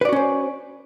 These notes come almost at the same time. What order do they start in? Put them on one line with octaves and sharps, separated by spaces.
B4 D5 F#4 C#4 C5